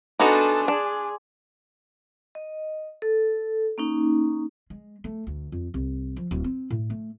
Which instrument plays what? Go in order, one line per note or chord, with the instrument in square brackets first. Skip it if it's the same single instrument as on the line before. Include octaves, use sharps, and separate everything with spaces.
[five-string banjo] B3 D#4 F#4 [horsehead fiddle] D4 A4 [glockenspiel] G#5 C6 D6
[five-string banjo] D4 [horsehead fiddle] G#4
[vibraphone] D#5
A4
A#3 C#4 D#4
[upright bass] G#3
A3
D2
F2
C2
F3
D1
C4
A2
A3